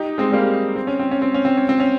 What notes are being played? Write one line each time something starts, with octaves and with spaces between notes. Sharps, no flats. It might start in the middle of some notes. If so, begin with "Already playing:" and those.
Already playing: D#4 G4
G#3 C4
G3 A#3
C4
C#4
C4
C#4
C4
C#4
C4
C#4
C4
C#4